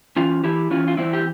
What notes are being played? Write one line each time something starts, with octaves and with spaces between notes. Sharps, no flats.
E3 C#4 F4
E3 E4 G4
E3 C#4 F4
F4
E3 C4 E4
G4